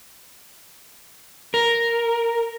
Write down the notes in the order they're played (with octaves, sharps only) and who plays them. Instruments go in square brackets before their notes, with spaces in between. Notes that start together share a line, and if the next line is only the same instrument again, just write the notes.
[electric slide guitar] A#4